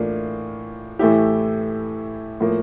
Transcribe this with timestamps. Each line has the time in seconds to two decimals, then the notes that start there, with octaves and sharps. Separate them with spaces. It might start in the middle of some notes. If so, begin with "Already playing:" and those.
Already playing: A2 E3 A#3 D4 F4
0.99 A2 E3 A3 E4 G4
2.41 A2 F3 A#3